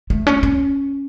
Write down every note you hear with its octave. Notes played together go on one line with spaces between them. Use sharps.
A3
C#4
C#4